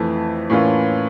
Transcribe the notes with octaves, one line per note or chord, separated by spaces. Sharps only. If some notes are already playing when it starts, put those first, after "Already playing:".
Already playing: F2 E3 A3
A2 E3 A#3 C#4 F4